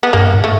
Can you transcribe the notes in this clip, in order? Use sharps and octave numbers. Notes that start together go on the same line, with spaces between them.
B3
G2 A#3
G#2
A3